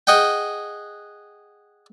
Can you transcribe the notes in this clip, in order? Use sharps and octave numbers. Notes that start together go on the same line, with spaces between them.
G#4 D#5 F#5 G5